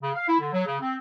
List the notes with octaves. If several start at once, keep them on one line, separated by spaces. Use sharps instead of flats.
C#3
F5
E4
D3
F#3
C#3
C4